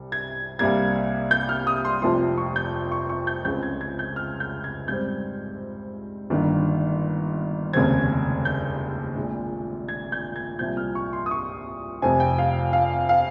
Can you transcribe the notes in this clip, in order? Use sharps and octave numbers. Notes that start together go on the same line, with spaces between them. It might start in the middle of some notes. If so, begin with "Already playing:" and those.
Already playing: C2 C3 G3
G#6
C2 C3 G3 A#3 G#6
G6
F6
D#6
C6
F1 F2 C3 F3 C6
C#6
G6
C#6
C#6
G6
C#2 C#3 G#3 C4 G6
G#6
G#6
G6
F6
G6
G#6
G#2 G3 C4 G6
G1 G2 D#3 A#3
F1 D#2 C#3 G#3 C4 G#6
G6
A#1 A#2 G#3
G#6
G6
G#6
C2 A#2 F3 G6
F6
C#6
C6
D#6
C#6
F1 F2 C3 F3 C4 G#5
G5
F5
F5
F5